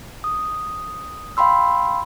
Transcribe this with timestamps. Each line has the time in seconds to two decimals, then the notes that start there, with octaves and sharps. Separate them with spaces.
0.24 D#6
1.37 F5 G5 B5 C6 E6